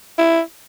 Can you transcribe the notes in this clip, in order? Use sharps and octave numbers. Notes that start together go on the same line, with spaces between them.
E4